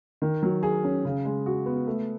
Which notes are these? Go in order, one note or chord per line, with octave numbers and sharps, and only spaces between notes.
D#3
F#3
G#4
C#4
C#3
G#3
F#4
B3
A3